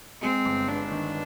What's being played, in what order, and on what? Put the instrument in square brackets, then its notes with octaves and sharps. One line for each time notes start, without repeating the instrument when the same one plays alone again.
[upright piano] G#3 [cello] C4
[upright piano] G1
[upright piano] G2 [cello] D4
[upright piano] D#3